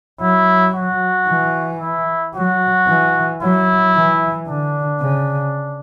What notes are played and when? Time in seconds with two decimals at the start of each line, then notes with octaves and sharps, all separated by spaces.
0.21 F#3 E4
0.75 F#4
1.27 E3
1.81 E4
2.34 F#3 F#4
2.87 E3
3.42 F#3 E4
3.95 E3
4.47 D3 D4
5.01 C#3